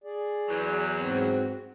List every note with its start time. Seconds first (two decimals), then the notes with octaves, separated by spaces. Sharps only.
0.04 G#4 D5
0.48 E2 F#3
0.98 G#2 C4 F#4